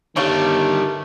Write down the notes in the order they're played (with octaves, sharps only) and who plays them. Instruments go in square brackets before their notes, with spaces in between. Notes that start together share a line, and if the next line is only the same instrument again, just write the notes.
[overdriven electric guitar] D3 G3 [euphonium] D#3 [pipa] A3 C#5 F5